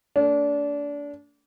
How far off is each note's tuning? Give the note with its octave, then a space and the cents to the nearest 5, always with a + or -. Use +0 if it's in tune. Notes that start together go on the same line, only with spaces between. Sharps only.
A3 +35 D4 -25